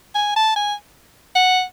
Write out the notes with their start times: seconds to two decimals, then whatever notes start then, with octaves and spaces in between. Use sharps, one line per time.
0.15 G#5
0.36 A5
0.56 G#5
1.35 F#5